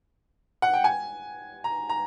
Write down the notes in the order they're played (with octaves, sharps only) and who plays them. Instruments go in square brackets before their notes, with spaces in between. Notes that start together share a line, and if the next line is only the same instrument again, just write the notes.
[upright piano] F#5
G5
G#5
A#5
A#5